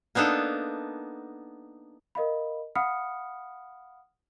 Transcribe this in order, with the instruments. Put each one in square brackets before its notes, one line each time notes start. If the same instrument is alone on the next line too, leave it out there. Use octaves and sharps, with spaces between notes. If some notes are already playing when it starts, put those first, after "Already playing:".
[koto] A#3 B3 D4 D#4 A4
[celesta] A#4 D#5 F5 B5
F5 F#5 B5 D#6 F6 C#7